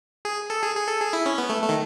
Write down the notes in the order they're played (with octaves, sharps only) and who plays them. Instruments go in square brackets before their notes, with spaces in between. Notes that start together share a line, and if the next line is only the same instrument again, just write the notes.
[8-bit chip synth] G#4
A4
G#4
G#4
A4
G#4
E4
C#4
B3
A3
A3
D#3